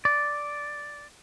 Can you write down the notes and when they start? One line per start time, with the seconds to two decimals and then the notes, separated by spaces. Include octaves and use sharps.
0.05 D5